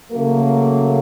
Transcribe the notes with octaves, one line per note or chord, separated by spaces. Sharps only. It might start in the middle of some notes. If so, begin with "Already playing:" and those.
C#3 F#3 A3 A#3